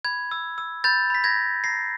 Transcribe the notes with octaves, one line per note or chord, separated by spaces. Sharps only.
B5 G#6
E6
E6
B5 G6 A6
B5 B6
G#6 A#6
B5
A#5 A#6 C7